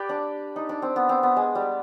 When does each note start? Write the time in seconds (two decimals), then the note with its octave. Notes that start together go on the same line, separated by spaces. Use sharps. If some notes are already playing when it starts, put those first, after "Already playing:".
Already playing: G4 B4 D5
0.09 D4
0.56 D#4
0.69 D4
0.82 C4
0.96 B3
1.09 C4
1.23 B3
1.36 G#3
1.55 G3